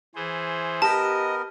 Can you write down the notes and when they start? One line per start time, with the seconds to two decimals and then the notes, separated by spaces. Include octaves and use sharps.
0.15 E3 G#4 C5
0.82 B3 G4 A#4 D#5 A5